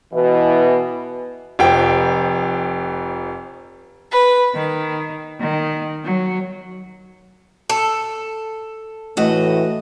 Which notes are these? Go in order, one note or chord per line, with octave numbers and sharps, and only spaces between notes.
B2 E3
F1 F2 G5
B4
D#3
D#3
F#3
A4
A2 E3 A3 F#4 D#5